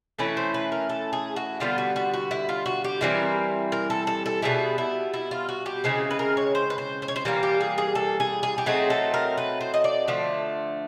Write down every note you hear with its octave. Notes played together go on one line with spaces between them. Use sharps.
E3 A3 C#4 E4 B4
C5
B4
A#4
A4
G#4
F#4
D3 G3 B3 F4
F#4
F#4
F#4
E4
F4
F#4
G4
E3 G3 C4 E4 A#4
A#4
A4
A4
A4
B2 G3 B3 E4 G#4
E4
E4
F4
F#4
G4
C#3 E3 G#3 C4 G#4
B4
A#4
C#5
C5
B4
C5
C5
C#5
C5
E3 G3 A#3 A#4
G4
G#4
G#4
A4
G#4
G#4
G4
F#3 A3 C4 D#4 G#4
A4
A#4
B4
C5
D#5
D5
D3 F3 A3